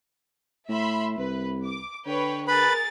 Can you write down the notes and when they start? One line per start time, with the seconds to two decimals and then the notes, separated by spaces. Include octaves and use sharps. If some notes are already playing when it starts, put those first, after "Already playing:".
0.69 A2 E5 B5 C6
1.18 C2 B4
1.65 D6
2.06 D3 B4 C#5 G5
2.48 G#4 A#4 B4 B5 A6